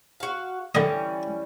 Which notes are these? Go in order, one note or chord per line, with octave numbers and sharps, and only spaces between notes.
F#4 F5
D3 E3 G3 C#4 D#5